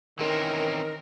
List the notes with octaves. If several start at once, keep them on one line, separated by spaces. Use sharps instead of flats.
D#3 E3 C4 C#4 A#4